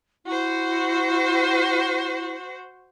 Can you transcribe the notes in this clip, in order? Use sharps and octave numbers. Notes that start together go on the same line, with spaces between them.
E4 F#4 C5